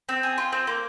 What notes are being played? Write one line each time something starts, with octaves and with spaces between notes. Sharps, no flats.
C4
G#4
F4
C4
A#3